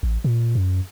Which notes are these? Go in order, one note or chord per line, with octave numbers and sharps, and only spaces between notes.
A1
A#2
F#2